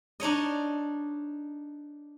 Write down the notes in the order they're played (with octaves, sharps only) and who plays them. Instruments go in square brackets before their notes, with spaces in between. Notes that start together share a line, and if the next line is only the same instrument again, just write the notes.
[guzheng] D4 D#4 C#5 D#5